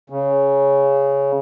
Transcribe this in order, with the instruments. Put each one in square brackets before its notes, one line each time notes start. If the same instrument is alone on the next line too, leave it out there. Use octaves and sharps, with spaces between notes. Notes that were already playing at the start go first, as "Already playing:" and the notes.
[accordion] C#3